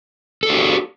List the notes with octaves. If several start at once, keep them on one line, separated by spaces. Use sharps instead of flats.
D4 F#4 G4 A4